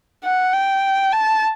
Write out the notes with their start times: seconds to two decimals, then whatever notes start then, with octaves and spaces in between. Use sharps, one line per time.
0.24 F#5
0.53 G5
1.12 A5